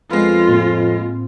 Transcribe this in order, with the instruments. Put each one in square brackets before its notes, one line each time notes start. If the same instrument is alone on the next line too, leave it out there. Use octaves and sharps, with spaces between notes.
[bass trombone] F2 [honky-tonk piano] G#3 B3 [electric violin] F4
[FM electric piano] A2 A#3 C4